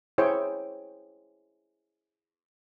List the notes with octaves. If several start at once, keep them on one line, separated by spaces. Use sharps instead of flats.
E4 G#4 C5 C#5 G5